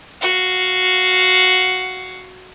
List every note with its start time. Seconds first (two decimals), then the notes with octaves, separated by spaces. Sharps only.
0.21 F#4 F5